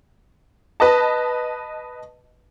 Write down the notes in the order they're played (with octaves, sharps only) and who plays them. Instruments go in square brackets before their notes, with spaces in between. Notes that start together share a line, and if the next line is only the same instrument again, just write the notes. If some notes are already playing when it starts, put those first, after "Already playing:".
[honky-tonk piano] B4 D#5 A5